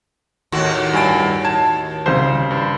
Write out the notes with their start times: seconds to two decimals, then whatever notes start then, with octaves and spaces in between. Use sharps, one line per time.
0.52 D#2 A2 F#4
0.93 G2 G#5 D7
1.45 A5 G#6
2.06 C2 C#3 C5
2.51 G2